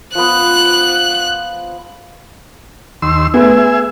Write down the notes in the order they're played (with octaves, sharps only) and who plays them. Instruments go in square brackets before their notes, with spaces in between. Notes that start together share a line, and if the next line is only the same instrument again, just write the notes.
[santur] F3 B3 [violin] F#6
[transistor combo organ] D#2 C6 E6
[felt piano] A3 B3 [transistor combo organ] G#4 E5